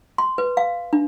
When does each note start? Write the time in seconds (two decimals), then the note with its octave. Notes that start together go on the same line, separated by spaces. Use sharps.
0.18 C6
0.38 B4
0.57 F5
0.93 D4